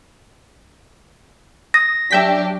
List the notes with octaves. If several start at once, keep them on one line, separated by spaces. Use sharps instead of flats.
D#6 A#6
F#3 D4 G4 E5 G5 B6